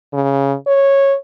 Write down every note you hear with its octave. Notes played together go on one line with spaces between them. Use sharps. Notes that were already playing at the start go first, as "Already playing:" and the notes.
C#3
C#5